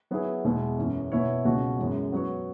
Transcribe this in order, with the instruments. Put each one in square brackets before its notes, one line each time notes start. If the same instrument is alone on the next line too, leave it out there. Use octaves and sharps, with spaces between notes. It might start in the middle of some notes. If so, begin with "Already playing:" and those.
[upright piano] F#3 B3 E4 G#4
E2 B2 G#3 E4 G#4
F#2 E3 C#4
B2 B3 E4 C#5
C#2 B2 F#3 C#4 F#4
F#2 E3 G#3
F#3 B3 F#4 C#5